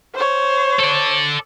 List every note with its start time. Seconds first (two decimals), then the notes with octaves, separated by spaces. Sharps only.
0.15 C5 C#5
0.79 A4 D5